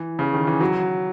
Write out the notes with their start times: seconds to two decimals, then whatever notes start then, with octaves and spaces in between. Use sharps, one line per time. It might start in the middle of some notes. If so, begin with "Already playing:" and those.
Already playing: E3
0.19 C#3
0.34 D#3
0.47 E3
0.61 F#3